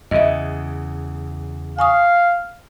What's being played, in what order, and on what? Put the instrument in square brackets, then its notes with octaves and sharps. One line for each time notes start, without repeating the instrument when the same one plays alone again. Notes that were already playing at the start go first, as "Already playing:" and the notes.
[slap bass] E2 C#3 [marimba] D#5 E5
[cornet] F5 [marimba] G#5 C#6 D#6